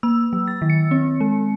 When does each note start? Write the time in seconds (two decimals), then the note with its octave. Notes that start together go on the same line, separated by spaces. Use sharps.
0.03 A#3 E6
0.33 F#3
0.48 A6
0.62 D#3
0.70 C#7
0.91 C4
1.20 G#3